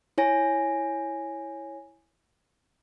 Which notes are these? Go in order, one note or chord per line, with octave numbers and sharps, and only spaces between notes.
E4 C#5 G#5 A#6